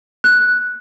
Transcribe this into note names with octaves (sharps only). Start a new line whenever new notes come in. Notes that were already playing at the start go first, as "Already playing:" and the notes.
F#6